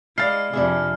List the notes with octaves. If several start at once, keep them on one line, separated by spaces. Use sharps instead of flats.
G#3 E4 D5 F5 F6 A6 C7
F2 C3 D4 E4 G#4